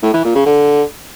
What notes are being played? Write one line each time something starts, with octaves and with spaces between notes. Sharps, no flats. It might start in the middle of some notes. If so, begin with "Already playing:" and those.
A2
E3
A#2
C#3
D3